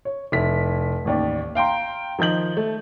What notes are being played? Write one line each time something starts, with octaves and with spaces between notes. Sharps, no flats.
C#5
F1 E4 B6
A1 D#2 D5
F5 G5 A#5 C6
D#3 F3 D#5 G6 F#7
A3